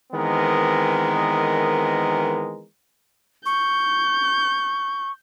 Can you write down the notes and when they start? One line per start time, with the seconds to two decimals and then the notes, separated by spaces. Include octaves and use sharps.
0.12 D#3 E3 G#3 B3 C4 A#4
3.46 C#6 G6